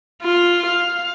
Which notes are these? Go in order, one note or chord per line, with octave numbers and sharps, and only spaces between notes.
F4
F5